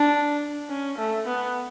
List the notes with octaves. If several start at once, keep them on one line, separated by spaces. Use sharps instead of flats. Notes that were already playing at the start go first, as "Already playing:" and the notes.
Already playing: D4
C#4
A3
B3